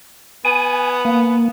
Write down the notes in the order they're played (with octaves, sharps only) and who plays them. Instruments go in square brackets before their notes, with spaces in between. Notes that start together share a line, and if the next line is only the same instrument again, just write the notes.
[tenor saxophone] B3 [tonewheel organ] G#5
[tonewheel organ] A#3